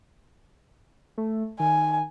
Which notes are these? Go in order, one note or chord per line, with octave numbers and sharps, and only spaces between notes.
A3
D#3 G#5